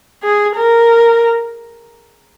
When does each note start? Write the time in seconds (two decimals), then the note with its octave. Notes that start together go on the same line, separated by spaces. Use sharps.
0.23 G#4
0.56 A#4